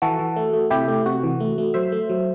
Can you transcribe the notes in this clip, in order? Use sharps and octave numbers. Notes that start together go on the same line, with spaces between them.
E3 F#4 A4
E3
A3
A3
C3 E4 G4
A3
C3 F#4
E3
A3
A3
F#3 C5 E5
A3
F#3